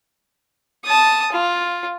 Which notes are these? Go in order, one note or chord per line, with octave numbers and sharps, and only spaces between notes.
A5 D#6
F4